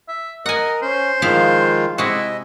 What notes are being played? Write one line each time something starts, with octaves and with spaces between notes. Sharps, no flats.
E5
A#4 D#5 F#5 G#5
C#4 C5
D#3 F3 G#3 E4 F4 F5
C3 G#3 E4 F#4 D#5